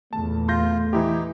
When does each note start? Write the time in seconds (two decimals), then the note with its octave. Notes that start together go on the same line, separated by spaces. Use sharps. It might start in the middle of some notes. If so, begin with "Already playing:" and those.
0.13 E2 A#2 A3 A5
0.48 F4 C6 G6 A#6
0.93 E3 D#4 E4 G4